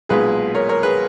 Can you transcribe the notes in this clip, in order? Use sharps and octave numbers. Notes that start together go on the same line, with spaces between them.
B1 A#2 G#3 G#4 B4
A#4 C#5
A#4 C#5
G#4 B4